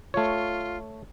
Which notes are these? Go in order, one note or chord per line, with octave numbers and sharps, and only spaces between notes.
A3 F4 C#5